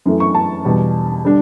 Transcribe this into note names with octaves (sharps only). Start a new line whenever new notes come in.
F#2 E3 A3
C#6
A5
E2 B2 G3
D3 G3 D4